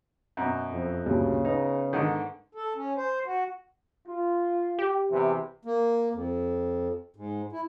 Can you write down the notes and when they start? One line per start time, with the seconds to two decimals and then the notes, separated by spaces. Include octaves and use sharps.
0.37 F#2 B2
0.72 F2
1.06 D2 G2 A#2 C#3
1.45 B3 D#4
1.93 G#2 D3 D#3
2.55 A4
2.76 C#4
2.97 C5
3.26 F#4
4.08 F4
4.79 G4
5.12 E2 C3 E3
5.65 A#3
6.14 F2
7.16 G#2
7.52 E4